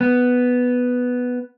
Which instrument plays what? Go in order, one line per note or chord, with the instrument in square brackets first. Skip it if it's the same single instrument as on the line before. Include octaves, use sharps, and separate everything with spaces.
[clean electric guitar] B3